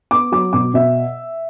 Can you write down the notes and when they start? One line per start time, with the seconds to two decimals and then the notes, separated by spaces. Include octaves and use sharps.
0.11 B3 D6
0.32 F#3 D6
0.53 B2 D6
0.74 B2 E5